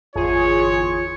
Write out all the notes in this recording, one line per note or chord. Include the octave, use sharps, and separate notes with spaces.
G1 E2 F4 G#4 C#5